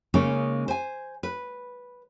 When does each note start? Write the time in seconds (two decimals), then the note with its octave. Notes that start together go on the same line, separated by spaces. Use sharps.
0.14 C#3 G#3 A#3 C#4 D#4
0.68 C5 G#5
1.23 B4